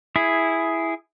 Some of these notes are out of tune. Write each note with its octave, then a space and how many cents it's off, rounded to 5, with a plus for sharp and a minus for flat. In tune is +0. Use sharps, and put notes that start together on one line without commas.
E4 +0 G#4 +0